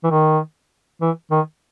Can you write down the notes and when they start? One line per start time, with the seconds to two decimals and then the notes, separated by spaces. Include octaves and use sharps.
0.04 E3
0.11 D#3
1.01 E3
1.31 D#3